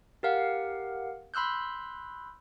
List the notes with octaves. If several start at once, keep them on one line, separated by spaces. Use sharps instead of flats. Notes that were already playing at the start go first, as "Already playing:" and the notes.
G4 A#4 F5 F#5
B5 C6 E6 F#6 G6